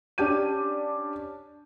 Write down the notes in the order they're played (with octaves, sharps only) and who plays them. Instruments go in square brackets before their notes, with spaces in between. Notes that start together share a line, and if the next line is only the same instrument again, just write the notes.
[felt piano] C#4 D4 G4 G6 D#7